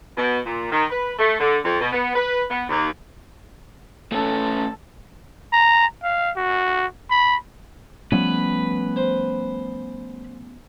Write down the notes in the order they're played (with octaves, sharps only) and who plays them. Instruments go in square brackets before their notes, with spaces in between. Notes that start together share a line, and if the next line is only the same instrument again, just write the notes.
[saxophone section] B2
A#2
D#3
B4
A3
D3
F2
B2
B3
B4
B3
D#2
[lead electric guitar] A3 C#4 [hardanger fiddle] A4
[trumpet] A#5
F5
F#4
B5
[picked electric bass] F3 G3 A3 [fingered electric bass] B3 C#4 [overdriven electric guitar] B4
[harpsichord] C5